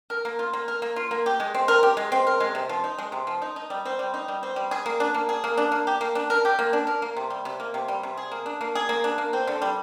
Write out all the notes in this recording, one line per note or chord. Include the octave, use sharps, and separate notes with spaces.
A#4
A#3
F4
A#3
A#4
A#3
F4
A#3
G4
G#3
C4
A#4
G4
G#3
C4
A#4
G#3
C3
F3
D#4
G#3
C3
F3
D#4
D#4
G3
C4
G3
D#4
G3
C4
G3
G#4
A#3
D4
A#3
G#4
A#3
D4
A#3
G4
A#3
D4
A#4
G4
A#3
D4
A#4
A#3
C3
G3
C3
A#3
C3
G3
C3
G#4
A#3
D4
A#3
G#4
A#3
D4
A#3
C4
D3
G3